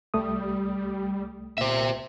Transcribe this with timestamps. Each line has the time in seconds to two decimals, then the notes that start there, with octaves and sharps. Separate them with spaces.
0.14 C2 G3 A3 D#6
1.58 A#2 C5 E5